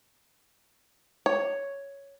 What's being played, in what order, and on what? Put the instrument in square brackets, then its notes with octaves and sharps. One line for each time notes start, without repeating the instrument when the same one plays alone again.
[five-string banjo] C#5